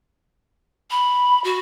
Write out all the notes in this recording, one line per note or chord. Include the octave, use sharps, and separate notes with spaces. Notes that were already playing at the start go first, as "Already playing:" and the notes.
B5
F#4